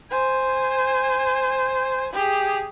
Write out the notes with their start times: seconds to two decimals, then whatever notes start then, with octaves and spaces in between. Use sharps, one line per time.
0.11 C5 G#5
2.13 G4 G#4